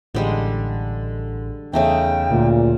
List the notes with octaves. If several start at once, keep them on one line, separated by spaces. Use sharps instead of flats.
A1 D3 G3 G#3
E2 C#3 A3 D#4 G5
D2 A#2